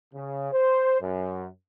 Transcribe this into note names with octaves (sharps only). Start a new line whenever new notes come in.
C#3
C5
F#2